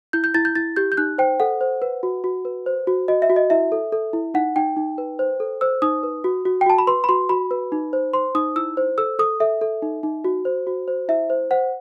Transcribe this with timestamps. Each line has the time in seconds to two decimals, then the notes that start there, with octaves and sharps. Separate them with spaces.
0.13 E4 G6
0.24 G6
0.34 E4 A6
0.45 G6
0.55 E4 A6
0.76 G4 G6
0.92 G6
0.97 D#4 F#6
1.18 C5 G5
1.40 A4 F#5
1.61 C5
1.82 B4
2.03 F#4
2.24 F#4
2.45 B4
2.66 C5
2.87 F#4
3.08 F#4 D#5
3.22 E5
3.30 F#4
3.36 D#5
3.50 E4 E5
3.72 A4
3.92 A4
4.13 E4
4.34 D#4 F#5
4.56 D#4 G5
4.77 D#4
4.98 B4
5.19 C5
5.40 A4
5.61 C5 E6
5.82 D#4 D#6
6.03 B4
6.24 F#4
6.45 F#4
6.61 G5
6.66 F#4 A5
6.78 B5
6.87 B4 C6
7.04 B5
7.09 F#4 C6
7.29 F#4 B5
7.51 B4
7.72 D#4
7.93 C5
8.13 C5 C6
8.35 D#4 D#6
8.56 E4 E6
8.77 C5
8.98 A4 E6
9.19 A4 D#6
9.40 A4 E5
9.61 A4
9.82 D#4
10.03 D#4
10.24 F#4
10.45 C5
10.67 F#4
10.88 C5
11.08 E4 E5
11.30 C5
11.51 C5 F#5